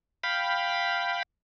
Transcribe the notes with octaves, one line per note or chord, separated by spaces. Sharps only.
F5 G5 B5